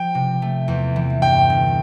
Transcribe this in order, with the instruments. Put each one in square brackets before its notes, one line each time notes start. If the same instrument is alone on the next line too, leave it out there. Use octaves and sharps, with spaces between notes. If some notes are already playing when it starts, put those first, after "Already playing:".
Already playing: [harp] F3 [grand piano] G5
[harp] C3
A3
E2
E3
[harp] G2 [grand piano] G5
[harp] G1